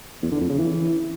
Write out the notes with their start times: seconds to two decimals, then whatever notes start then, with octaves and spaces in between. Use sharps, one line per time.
0.22 E2
0.31 D3
0.40 F2
0.49 C#3
0.58 E3